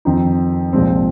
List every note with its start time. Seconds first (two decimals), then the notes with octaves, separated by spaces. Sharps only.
0.05 F2 D#3 C4 D#4
0.73 C2 A#2 F3 G#3 C4